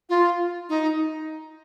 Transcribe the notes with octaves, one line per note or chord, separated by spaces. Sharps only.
F4
D#4